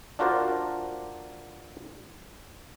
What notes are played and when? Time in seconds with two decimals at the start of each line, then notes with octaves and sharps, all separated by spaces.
0.19 D4 F4 F#4 A#4 C5 D5